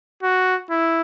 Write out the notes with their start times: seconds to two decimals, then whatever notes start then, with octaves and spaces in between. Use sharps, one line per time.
0.23 F#4
0.70 E4